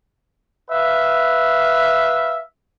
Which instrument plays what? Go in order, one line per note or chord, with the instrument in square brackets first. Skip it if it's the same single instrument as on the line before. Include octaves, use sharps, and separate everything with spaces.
[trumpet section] B4 E5 F5